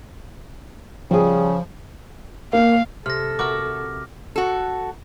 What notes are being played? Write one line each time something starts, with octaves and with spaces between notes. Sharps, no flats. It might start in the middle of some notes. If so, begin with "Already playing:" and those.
C#3 F3 G3 G#4
A#3 F5
C3 A4 F6 A#6
F#4 A#4 E5 D6 F6
F#4 A4